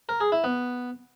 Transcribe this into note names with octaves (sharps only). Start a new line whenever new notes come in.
A#4
G#4
E4
B3